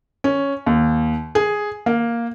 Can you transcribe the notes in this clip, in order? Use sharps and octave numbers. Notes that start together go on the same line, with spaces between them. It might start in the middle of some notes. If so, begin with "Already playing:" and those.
C#4
D#2
G#4
A#3